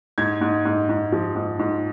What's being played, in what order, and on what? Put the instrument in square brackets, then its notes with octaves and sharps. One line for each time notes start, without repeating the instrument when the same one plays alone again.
[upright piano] G#2 G#6
G#2
G#2
G#2
F3
G#2
G#2